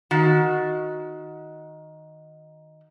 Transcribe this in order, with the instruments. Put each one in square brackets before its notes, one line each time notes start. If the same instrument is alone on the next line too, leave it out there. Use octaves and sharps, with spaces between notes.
[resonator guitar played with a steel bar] D#3 F#4